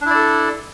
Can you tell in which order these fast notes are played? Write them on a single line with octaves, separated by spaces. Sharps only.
D4 E4 D5 A4